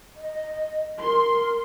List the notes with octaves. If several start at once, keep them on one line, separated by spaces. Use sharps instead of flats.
D#5
A#4 C6